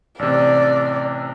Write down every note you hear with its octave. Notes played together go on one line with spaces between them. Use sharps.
A1 C3 D5